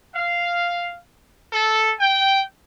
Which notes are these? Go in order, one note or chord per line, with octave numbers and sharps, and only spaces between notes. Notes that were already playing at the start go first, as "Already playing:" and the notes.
F5
A4
G5